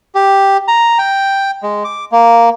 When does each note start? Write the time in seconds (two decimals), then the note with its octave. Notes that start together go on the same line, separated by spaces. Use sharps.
0.15 G4
0.68 A#5
0.98 G5
1.63 G#3
1.84 D6
2.12 A#3